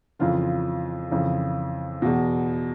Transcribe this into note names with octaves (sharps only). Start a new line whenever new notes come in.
F2 C#3 E3 F4
F2 C#3 E3
E2 B2